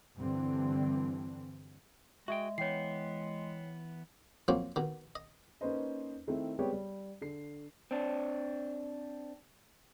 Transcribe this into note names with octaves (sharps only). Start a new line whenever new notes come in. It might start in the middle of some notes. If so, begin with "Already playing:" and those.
G2 D3 E3 C4
G#3 F#4 G#4 E5 G5
E3 B3 C#5 G5 C7
F3 F#3 A#3 C4 C#4
B2 D#3
D#5
A#3 C#4 D#4 B4 C5 D#5
D#3 A3 C4 E4
G3 G#3 B3 C4 G4 C#5
G3
D3 C7
C4 D4